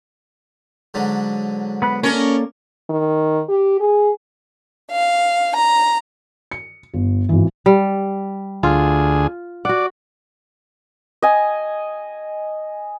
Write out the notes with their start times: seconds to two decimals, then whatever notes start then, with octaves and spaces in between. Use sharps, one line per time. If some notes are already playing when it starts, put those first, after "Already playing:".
0.94 G#2 D3 F#3
1.82 B3 B5 F#6
2.03 A#3 C#4 A4 A#4 C#5 D5
2.90 D#3
3.49 G4
3.80 G#4
4.91 F5
5.56 A#5
6.51 C#7
6.94 G1
7.29 G#1 E3
7.66 G3
8.63 D2 F4 G#4
9.65 F#4 D5 F#5
11.22 D#5 G#5